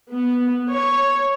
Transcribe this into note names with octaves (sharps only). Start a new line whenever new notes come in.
B3
C#5